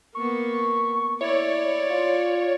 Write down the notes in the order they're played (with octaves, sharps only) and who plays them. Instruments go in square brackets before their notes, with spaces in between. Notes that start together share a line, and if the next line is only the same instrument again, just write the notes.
[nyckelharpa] A#3 B3 [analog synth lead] C#6
[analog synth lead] E4 [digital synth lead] C#5 [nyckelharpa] D5
[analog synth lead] F4